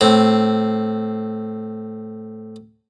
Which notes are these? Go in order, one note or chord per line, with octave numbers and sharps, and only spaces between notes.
A2 C4